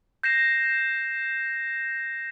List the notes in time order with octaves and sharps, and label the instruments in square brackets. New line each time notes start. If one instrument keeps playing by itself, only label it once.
[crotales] G6 A#6 C7 E7